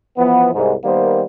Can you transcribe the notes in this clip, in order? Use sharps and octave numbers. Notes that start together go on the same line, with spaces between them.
E3 F3 B3
C2 G#2
D#3 G3 A#3 B3 C5